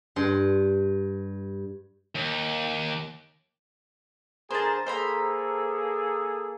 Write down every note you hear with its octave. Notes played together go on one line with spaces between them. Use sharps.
G2 C6
D#2
D3 G#4 A#4 C5 A5
A#3 G#4 A4 C5 A#5 B5